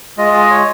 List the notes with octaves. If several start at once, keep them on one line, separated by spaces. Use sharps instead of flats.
G#3 F4 D#5
D#5
C#5